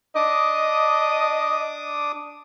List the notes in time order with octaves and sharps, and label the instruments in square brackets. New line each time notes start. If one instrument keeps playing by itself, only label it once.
[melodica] D4 D6 D#6 [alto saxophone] D#5